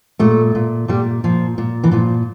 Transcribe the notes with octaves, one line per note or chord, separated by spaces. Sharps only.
A#2 A3
A#2
A#2 G3
A#2 F3
A#2
E3
A#2 F3